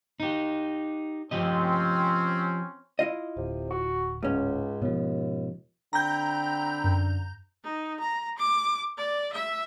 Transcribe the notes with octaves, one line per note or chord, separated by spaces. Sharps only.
D#4 G4
F3 C4 C#4 G4 D#5
E4 F4 D#5
D1 C3
F#4
C#2 G#2 C#4
D#2 B2 F3
D3 C4 G5 A#5 B5 G6
F#2
D#4
A#5
D6
D5
E5